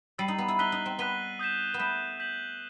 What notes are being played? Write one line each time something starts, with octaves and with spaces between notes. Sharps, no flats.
G3 E6 A6 C7 D#7 F#7
D#4
B3
E4
D#4 F#6 B6 D#7 G7
D#4
C4
B3 F#6 B6 D#7 G7
D#6 G6 B6 E7
B3
A3 D#6 G6 B6 E7
G6 B6 F#7